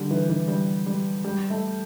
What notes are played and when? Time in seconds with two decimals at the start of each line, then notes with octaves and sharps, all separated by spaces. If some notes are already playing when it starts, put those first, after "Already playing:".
Already playing: D3 G3
0.11 E3
0.29 E3
0.48 G3
0.86 G3
1.25 G3
1.50 A3